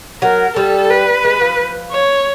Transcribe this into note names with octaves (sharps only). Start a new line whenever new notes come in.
F#3 A#4
G3 A4
B4
G#3
F3
C#5